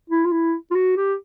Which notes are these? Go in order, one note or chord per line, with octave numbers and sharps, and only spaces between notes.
E4
F4
E4
F4
F#4
G4